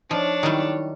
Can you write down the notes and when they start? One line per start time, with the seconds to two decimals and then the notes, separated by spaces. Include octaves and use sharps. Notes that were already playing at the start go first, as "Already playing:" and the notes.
0.11 F3 D4 D#4 C#5
0.43 D#3 F#3 G3 D#4 E4